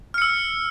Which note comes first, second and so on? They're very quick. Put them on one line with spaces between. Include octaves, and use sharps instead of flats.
F6 C#7 E6